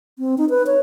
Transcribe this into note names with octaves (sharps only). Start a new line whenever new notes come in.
C4
D#4
B4
C#5